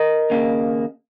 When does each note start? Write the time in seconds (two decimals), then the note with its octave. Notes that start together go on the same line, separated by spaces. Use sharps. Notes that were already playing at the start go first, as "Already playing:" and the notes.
Already playing: A#4 D#5
0.30 D#2 C#3 A#3